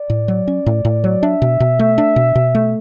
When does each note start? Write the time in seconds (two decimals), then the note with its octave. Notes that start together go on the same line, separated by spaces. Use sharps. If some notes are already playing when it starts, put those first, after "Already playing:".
Already playing: D5
0.10 A2
0.28 F#3
0.48 C#4
0.66 A2
0.85 A2
1.04 F#3
1.23 D4 E5
1.42 B2
1.60 B2
1.79 A3
1.98 D4
2.16 B2
2.35 B2
2.55 A3